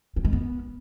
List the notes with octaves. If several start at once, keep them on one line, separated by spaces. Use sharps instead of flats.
F#3
G#3
B3